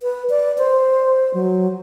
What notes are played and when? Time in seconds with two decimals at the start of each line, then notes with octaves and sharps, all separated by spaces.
0.03 B4
0.30 D5
0.58 C5
1.34 F#3